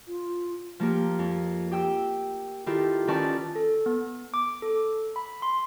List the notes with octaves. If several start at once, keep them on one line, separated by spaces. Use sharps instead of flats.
F4
F3 A#3 G4
F2
G4 G5 E6
D#3 E4 F4 G4 A4
D#3 C#4 B4 D5 A5 C#6
A4
B3
D6
A4
B5
C6